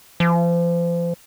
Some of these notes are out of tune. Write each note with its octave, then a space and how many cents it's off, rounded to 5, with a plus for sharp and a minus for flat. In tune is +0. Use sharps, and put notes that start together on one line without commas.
F3 -35